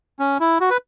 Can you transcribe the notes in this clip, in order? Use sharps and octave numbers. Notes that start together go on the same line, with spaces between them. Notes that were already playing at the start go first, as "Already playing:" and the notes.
C#4
E4
F#4
B4